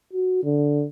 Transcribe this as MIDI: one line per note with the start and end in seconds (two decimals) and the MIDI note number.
0.13 0.42 66
0.44 0.85 50